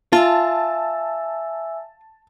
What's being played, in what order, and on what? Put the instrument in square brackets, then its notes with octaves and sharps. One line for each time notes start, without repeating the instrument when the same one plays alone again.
[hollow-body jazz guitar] F4 [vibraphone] E5 G#5 E6 [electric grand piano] A5